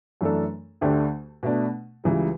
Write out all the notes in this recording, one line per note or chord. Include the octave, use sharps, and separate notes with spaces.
F#2 E3 A3 D4 A4
D2 D3 A3 D4 G4
B2 A3 D4
C#2 C#3 E3 G3